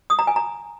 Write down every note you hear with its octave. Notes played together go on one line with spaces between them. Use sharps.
D#6
A#5
G#5
A#5